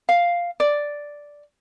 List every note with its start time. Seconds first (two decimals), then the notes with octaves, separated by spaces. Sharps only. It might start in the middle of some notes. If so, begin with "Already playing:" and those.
0.09 F5
0.60 D5